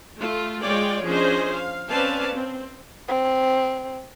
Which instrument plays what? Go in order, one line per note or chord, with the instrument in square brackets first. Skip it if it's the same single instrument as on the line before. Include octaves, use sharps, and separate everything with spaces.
[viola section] A3 F4
G#3 F4 C#5 D5 G5
F3 C#4 D4 G#4 C5 D#5
F5
C4 C#4 B4 D5 F5 A5
C4
[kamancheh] C4